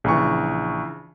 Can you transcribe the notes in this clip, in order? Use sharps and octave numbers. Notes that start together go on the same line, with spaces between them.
A#1 C#3 E3 C#6